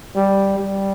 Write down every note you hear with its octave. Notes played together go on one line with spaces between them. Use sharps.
G3
G3